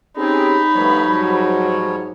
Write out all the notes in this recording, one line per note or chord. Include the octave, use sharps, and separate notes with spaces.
C4 C#4 D#4 G4 G#4 B5
G2 F3 G3 A3 B3 C#5
G#2 F#3